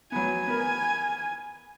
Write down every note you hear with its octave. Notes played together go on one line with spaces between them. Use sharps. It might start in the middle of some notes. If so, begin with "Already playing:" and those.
F#3 B3 G#5
B3 A#4